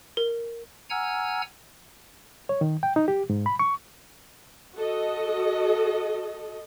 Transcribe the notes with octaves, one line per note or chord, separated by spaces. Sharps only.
A#4
F#5 G#5 A#5 E6 F6 G#6
C#5
D#3
G5
D#4
G4
G#2
B5
C#6
F#4 A4 D#5